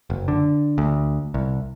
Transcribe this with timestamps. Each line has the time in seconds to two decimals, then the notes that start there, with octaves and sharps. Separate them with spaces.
0.10 F#1
0.28 D3
0.78 D2
1.34 C2